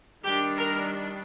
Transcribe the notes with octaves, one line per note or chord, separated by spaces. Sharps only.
D#3 G3 D4 G4
A#4